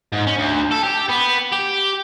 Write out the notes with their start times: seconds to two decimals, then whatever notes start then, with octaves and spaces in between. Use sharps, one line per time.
0.12 G#2
0.27 C#4
0.39 D2
0.71 A4
0.83 G4
1.09 B3
1.53 G4